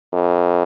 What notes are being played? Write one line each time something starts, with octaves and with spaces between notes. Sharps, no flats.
F2